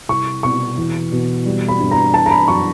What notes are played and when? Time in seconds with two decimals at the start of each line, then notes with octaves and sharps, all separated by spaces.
0.09 C2 C#6
0.43 B2 C#6
0.77 E2
1.12 B2
1.46 G3
1.68 B5
1.80 G2
1.91 A#5
2.13 E3 A5
2.26 A#5
2.31 B5
2.48 F#2 C#6